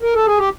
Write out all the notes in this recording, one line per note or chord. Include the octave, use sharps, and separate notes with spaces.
A#4
A4
G#4
G4